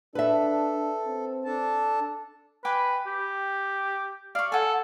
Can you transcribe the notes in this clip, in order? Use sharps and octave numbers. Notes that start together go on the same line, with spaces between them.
D4 A4 B4 E5
C4
D4 A4 A5
B4 G5 G#5 D6
G4
D5 F5 C#6
A4 F#5 G#5